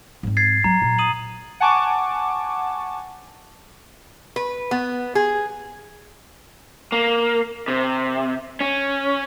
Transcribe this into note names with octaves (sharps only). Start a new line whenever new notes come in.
G#2 C4
G#6 A6 C7
F#3 A#5
A#2
D#6 D#7 F#7
F#5 G#5 A5 C#6 D6
B4
B3
G#4
A#3
C3
C#4